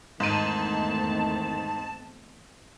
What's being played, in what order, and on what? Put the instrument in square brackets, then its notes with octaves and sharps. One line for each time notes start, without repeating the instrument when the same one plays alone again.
[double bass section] E2 A3 C4 [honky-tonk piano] G#2 D#7 [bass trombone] D#3 [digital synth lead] A5